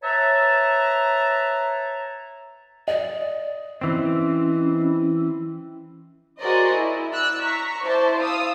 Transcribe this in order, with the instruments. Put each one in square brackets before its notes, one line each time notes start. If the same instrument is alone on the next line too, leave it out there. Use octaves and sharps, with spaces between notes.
[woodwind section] B4 C#5 E5 A5 A#5
[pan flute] D5 [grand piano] D#5
[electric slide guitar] E3 C4 [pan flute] C#4
[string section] F#4 G#4 A#4 C5 D5 D#5
E4
D5 E6 F#6
A#5 C#6 B6
E4 C5 D5 A5
F5 D#6 E6